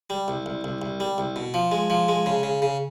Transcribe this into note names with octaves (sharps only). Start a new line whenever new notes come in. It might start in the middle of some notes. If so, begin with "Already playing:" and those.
G3
C2
C2
C2
C2
G3
C2
B2
F3
G#3
F3
G#3
C#3
C#3
C#3